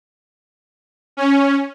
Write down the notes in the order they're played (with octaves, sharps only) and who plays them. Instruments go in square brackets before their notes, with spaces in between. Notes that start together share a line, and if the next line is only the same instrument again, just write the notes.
[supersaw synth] C#4